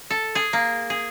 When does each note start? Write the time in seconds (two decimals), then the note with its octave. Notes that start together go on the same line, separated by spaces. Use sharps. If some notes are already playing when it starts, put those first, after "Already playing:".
0.10 A4
0.35 G#4
0.53 A#3
0.90 G#4